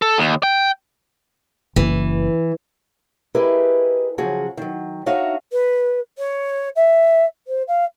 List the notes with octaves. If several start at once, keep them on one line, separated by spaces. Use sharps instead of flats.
A4
D#2
G5
F#1 E3
E4 G4 G#4 A#4 B4 D#5
C#3 F3 F#3 F#4 G#4
D#3 F#3
D4 D#4 F#4 C#5 E5 F5
B4
C#5
E5
C5
F5